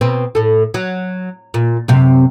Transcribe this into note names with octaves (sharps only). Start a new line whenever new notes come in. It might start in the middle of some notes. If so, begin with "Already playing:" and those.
B2 C4
A2 A4
F#3
A#2
F#2 C3